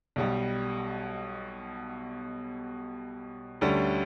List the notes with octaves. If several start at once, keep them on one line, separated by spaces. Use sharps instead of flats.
B1 B2 G3
D2 D3 G3 C#4